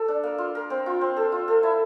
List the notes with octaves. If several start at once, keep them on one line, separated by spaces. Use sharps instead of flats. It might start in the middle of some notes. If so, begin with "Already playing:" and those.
Already playing: A4
D4
A#3
F4
A#4
C4
F4
C4
A4
F4
A4
E4